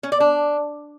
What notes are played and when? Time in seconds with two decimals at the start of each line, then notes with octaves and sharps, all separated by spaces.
0.03 C#4
0.12 D5
0.20 D4